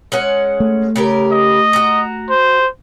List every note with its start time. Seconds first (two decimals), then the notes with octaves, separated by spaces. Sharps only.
0.12 G#3 C#4 F#5
0.60 A3
0.96 C#3 G4 A#4
1.32 D#5
1.73 F#4 A#5
2.30 C5